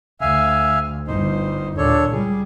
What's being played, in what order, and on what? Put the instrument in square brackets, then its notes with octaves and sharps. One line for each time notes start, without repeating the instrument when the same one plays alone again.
[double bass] D2 [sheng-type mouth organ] E5 F5 G#5
[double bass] G1 G2 [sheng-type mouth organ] D#4 C5
[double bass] D#2 A#2 [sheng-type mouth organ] D4 A4 C#5
[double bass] C#2 G3 [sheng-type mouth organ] G#4